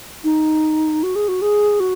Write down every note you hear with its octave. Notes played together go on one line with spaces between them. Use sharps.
D#4
F#4
G#4
F#4
G#4
F#4